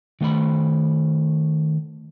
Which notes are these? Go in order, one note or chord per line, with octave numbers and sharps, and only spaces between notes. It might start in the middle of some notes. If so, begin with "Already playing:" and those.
D#3 A3 F5 B5